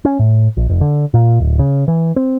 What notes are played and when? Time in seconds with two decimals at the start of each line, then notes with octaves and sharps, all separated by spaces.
0.05 C#4
0.19 A2
0.57 A#1
0.69 F1
0.81 D3
1.14 A#2
1.40 D1
1.59 C#3
1.88 E3
2.16 C4